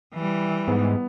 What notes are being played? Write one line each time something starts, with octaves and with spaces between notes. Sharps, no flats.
E3 G3
G#2 B3